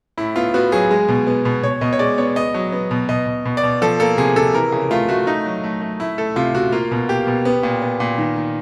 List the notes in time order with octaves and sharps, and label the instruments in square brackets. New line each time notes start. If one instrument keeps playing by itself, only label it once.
[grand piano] A2 E4
B3 F4
B3 F#4
F#3 G#4
G#3
B2
B3
B2
B2 C#5
B2 D#5
C#5
G#3 D5
B3 C#5
B3 D#5
F#3
B3
B2
B2 D#5
B2
B2
D5
B2
F3 A4
A#3 A4
C3 G#4
C3 A4
E3 A#4
C#3
A3 F4
A3 F#4
A3 D#4
F#3
A3
A3
A3 E4
A3 A4
C3 F4
C3 F#4
A#3 F4
B2
A#3 G4
B2
B3
A#2
B3
A#2
D#3
D#3